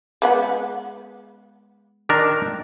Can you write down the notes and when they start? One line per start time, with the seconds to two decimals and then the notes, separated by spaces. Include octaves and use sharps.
0.22 G#3 B3 F#5
2.09 D#3 D4 A#4